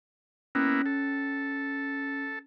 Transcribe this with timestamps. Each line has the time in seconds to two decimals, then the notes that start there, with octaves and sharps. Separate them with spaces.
0.55 A#3 B3 C#4 E4
0.86 A4